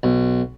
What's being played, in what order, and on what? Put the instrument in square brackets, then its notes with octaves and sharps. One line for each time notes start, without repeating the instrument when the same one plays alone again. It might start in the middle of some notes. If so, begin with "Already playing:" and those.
[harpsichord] B1